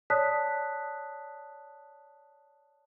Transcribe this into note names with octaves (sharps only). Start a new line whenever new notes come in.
C#5 D5 A5 D#6 F#6 B6